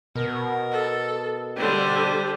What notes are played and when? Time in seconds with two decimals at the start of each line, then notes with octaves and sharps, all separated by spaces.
0.16 B2 A#4
0.71 A4
1.56 D3 G3 G4 C5